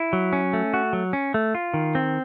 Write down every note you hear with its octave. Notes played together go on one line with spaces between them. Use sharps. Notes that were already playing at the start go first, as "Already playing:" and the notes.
Already playing: E4
F#3
C#4
A3
F#4
F#3
C#4
A3
F4
D#3
C4